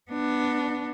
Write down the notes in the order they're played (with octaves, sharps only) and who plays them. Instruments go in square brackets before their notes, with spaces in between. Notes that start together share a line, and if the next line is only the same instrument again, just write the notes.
[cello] B3 D4